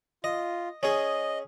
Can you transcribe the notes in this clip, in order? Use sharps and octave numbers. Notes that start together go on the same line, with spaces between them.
F4 D#5
C#4 G#4 D#5